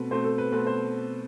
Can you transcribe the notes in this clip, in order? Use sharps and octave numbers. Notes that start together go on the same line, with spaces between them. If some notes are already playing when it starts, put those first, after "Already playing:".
Already playing: B2 A3 C4 B4
B2 A3 C4 C5
A4
B4
B2 A3 C4 B4
C5